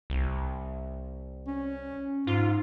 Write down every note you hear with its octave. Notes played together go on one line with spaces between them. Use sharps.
C2
C#4
G#2 F4